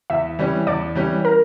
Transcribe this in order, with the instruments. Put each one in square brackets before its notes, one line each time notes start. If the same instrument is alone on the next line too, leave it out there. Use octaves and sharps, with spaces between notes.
[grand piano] E2 [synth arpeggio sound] E5
[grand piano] E3 G3 C#4
[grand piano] E2 [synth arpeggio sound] D5
[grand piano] E3 G3 C#4
[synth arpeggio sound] A#4